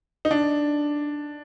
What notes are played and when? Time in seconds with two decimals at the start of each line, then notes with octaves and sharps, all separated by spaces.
0.25 D#4
0.31 D4